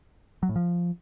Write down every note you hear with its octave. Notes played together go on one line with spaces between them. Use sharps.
F#3
A2
F3